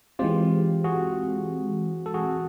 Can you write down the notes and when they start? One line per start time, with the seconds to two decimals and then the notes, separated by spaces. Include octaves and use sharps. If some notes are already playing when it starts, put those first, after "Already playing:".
0.19 E3 G#3 C4 F4 G4
0.84 F#4 G#4
2.06 A4
2.14 F#4 G#4